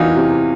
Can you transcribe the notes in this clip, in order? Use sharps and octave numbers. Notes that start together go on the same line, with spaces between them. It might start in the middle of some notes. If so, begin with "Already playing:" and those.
Already playing: E2 E3 D#4 F4 F#4
C3